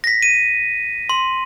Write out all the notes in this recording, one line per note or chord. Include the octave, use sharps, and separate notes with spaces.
A#6 B6
D#7
C6